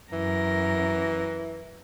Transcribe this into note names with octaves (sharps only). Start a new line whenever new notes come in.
F#2 E3 A#4 A#6